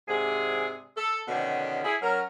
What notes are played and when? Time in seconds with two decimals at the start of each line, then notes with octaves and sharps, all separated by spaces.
0.08 G#2 C3 D4 G#4
0.97 A4
1.28 B2 D3 D#3 F3 C#4
1.84 E4 G#4
2.02 F#3 C#4 A#4